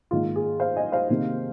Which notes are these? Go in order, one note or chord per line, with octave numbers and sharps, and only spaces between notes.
G#2 D#3 A#3 D#4 F4
G#4
C5 F5
D#5 G#5
C5 F5
C3 D#3 A#3 D#4